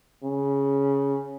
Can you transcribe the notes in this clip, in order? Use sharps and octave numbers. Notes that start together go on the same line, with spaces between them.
C#3